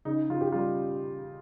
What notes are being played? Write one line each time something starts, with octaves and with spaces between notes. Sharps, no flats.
C#3 D#4
C#3 F4
G4
G3 F4